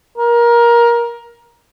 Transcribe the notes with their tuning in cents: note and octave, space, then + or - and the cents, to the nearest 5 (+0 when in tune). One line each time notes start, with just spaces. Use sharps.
A#4 +20